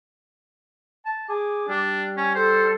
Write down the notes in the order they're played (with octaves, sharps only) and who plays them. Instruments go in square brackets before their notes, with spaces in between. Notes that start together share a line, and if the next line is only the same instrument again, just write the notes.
[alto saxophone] A5
[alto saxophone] G#4 [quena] D6
[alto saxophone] G3 [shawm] D4
[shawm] C#4 [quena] G#5
[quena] A4 [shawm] C5